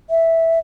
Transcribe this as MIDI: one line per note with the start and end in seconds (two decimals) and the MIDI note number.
0.10 0.59 76